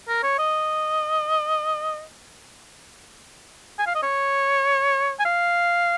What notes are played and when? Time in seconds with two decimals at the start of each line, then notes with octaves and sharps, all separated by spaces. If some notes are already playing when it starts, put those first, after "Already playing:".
0.08 A#4
0.23 C#5
0.39 D#5
3.79 G#5
3.86 F5
3.95 D#5
4.03 C#5
5.19 G#5
5.25 F5